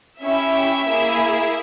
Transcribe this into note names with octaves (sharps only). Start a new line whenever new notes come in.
C#4 E4 G4 E5
A#3 E4 G#4